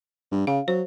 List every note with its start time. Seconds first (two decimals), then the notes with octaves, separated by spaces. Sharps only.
0.32 G2
0.47 C#3 F5
0.68 F#3 C5